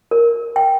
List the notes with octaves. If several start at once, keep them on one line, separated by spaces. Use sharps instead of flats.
A#4
G5